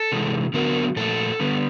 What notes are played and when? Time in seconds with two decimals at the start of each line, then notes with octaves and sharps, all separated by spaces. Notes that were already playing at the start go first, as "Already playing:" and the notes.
Already playing: A4
0.12 C3 E3 G#3
0.54 D3 F#3 B3 A#4
0.96 A#2 F3 A3 A4
1.40 D3 G3 B3